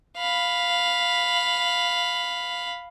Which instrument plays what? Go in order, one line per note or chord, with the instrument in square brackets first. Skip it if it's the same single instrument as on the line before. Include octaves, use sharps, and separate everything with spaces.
[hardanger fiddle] F5 B5